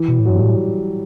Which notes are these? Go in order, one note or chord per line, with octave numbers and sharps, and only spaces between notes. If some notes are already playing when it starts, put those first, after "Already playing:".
Already playing: E3
B2
A2
G2 F#3
G3
A2